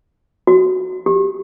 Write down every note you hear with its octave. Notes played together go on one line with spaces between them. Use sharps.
F#4
G4